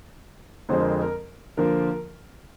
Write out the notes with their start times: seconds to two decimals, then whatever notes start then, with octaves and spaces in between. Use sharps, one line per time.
0.69 F2 D3 F3 G#3 C4 C5
0.80 A#4
1.02 A#4
1.57 D3 F3 A#3 F4 A#4